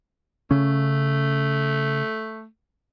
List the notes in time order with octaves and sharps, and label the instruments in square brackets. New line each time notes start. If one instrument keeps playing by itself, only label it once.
[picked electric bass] C#3 C#4 [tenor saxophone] A3